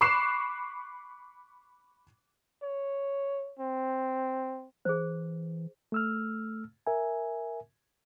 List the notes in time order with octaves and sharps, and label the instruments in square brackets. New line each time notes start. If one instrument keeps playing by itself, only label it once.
[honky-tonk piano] B5 C#6 D6 F#6 C7 E7
[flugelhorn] C#5
C4
[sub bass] E3 [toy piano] G#4 C5
[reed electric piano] A3 E6 F6
A#4 E5 G#5